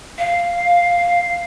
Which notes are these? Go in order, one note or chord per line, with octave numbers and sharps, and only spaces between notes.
F5